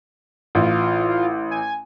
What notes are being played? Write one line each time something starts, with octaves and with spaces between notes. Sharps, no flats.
A1 F4
G#5